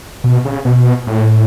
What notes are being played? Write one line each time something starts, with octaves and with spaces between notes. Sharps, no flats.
B2
C#3
B2
A2